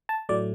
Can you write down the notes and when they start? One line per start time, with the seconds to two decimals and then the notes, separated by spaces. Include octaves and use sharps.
0.09 A5
0.29 A2 F#3 A3 D5